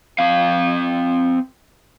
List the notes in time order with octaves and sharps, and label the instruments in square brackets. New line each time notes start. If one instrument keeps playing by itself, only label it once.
[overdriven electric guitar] C4 F5